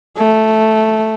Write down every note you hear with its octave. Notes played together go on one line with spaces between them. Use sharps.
A3